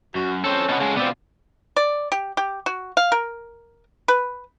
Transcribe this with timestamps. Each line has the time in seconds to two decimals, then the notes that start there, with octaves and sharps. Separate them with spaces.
0.15 F#2 F#4
0.44 C4 C#4 A4 C5
0.69 B2 B3 A4 F#5
0.81 C#3 G#3
0.96 B2 B3 C4 F4 D5
1.76 D5
2.12 G4
2.37 G4
2.66 F#4
2.97 F5
3.12 A#4
4.08 B4